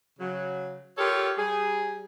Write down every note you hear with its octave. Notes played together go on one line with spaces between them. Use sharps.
C#3 F#3
F4 G4 A4 A#4 C#5
G3 G#4